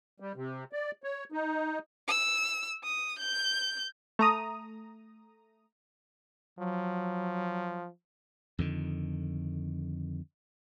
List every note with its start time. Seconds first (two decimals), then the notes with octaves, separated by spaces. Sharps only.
0.20 G3
0.36 C3
0.73 D5
1.04 C#5
1.32 D#4
2.08 E6
2.84 D#6
3.19 G6
4.19 A3 A#5 D#6
6.59 F3 F#3
8.59 F2 D3 D#3